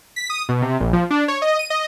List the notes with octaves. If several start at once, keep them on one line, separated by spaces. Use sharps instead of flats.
B6
D#6
B2
C3
A#1
F3
D4
C#5
D#5
D#7
D#5